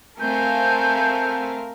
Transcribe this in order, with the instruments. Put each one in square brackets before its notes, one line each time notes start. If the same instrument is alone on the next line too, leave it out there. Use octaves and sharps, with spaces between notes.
[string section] A3 C4 F5 [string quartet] A4 G#5 [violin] A#4 [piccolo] G6